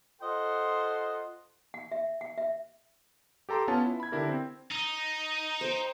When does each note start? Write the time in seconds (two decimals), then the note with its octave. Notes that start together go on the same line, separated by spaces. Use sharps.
0.21 F4 A4 C5 D#5 F#5 C6
1.74 F#5
1.92 E5
2.21 F#5
2.38 E5
3.49 G4 A4 A#5 C6 D6
3.68 B3 C#4 F4 A5
3.85 E4
4.00 B5 G#6
4.12 D3 D4 E4 G4 A#4
4.28 C4
4.72 D#4
5.61 C5 G5